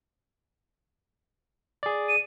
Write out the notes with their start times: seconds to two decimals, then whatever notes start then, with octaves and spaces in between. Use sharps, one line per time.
1.83 G#4 D5
2.08 D#7